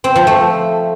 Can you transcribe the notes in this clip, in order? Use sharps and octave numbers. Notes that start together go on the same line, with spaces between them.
C4
F3
A3